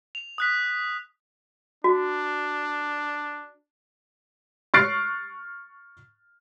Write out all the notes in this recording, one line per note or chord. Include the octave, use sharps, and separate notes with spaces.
F7
D#6 F#6 B6
D4 F#4
C#6 F6 F#6 A6 C7 D7